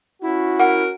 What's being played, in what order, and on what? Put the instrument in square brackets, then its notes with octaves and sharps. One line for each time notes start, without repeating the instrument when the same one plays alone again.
[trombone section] C#4 F#4 [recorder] E4
[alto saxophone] A#4 [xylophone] F#5